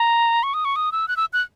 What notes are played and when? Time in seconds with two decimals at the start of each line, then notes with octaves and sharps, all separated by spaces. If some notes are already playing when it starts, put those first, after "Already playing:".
Already playing: A#5
0.43 C#6
0.54 D#6
0.65 C#6
0.76 D#6
0.92 E6
1.08 F#6
1.17 E6
1.33 F#6